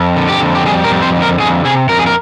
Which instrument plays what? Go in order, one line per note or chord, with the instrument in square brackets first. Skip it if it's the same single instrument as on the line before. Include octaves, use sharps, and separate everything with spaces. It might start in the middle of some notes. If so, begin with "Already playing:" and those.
Already playing: [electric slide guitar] F2
D3
G4
F2
G4
G3 G#4
A#4
F2
C5
D3
A#4
F2 G#4
C3 G#4
F2 A#4
G#4
A#4